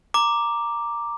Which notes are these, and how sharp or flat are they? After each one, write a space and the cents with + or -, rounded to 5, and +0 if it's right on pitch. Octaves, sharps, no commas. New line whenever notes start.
A#5 +0 D6 +0